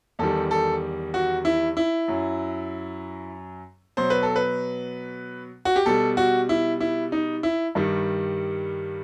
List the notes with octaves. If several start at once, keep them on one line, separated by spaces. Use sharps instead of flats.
E2 D#3 G3 A4
A4
F#4
E4
E4
F#2 F#3
B2 F#3 C5
B4
A4
B4
F#4
G4
B2 G3 A4
F#4
E4
E4
D#4
E4
G2 D#3 G3